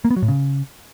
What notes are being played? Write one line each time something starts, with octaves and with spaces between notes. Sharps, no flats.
A#3
B3
F#3
A2
C#3